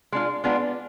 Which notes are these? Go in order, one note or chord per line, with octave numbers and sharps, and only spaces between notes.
G#3 D4 F4
G#3 B3 D4 F4